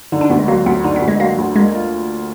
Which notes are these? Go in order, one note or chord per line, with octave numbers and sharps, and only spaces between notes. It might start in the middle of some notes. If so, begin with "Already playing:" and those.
D3 D#4
D4
D2 B3
G#3
F#3 A#3
D2 B3
D3 D#4
B3
D2
G#3
F#3 A#3
D2
G#3 A#3
F4